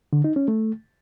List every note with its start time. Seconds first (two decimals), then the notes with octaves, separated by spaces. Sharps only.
0.13 D3
0.24 D#4
0.36 C#4
0.48 A3